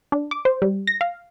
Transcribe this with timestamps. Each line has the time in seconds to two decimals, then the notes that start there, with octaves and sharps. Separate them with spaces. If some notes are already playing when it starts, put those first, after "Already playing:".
0.12 D4
0.31 D6
0.45 C5
0.62 G3
0.87 A#6
1.01 F5